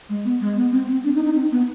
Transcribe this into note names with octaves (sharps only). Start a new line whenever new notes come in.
G#3
B3
G#3
B3
C4
C4
D4
D#4
D#4
C4
B3